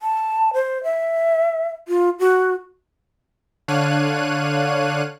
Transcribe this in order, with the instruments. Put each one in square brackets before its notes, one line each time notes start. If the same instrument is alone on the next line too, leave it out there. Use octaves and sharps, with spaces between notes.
[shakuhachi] A5
C5
E5
F4
F#4
[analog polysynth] D3 D4 C#5 F5 F#6 D#7